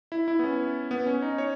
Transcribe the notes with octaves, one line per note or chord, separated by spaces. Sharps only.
E4
E4
B3
C#4
B3
C#4
D#4
C#5